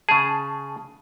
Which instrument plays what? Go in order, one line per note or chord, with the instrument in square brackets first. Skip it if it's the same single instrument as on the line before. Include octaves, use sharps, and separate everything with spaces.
[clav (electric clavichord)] C#3 G#4 [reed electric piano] A5